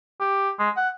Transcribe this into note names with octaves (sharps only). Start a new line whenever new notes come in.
G4
G#3
F#5